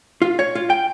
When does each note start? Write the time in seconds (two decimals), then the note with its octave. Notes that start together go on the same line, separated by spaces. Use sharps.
0.22 F4
0.39 C#5
0.55 F4
0.70 G5